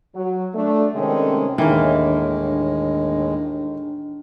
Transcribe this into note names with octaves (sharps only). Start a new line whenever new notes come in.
F#3
A3 D4
C3 D#3 G#3 A3 C4 C#4
D#2 A2 D#3 E3 G#3 A#3 D4